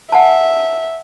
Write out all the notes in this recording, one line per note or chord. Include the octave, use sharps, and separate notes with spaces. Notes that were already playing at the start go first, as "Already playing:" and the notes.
E5 F#5 G#5 A5